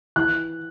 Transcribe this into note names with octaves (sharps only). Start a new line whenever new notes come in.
E3 F#6